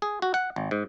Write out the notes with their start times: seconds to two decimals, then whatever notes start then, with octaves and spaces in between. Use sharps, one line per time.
0.02 G#4
0.22 F#4
0.34 F#5
0.56 G#1
0.71 G#2